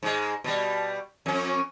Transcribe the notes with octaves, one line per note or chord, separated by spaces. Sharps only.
G#2 G#3
B2 G3
F2 C#4